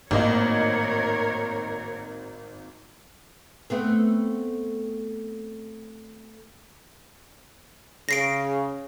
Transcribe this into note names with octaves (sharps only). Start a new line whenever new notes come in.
G#1 A2 A#3 A#4 C#5 D#5
A3 B3 C4
C#3 A#6 C7 D7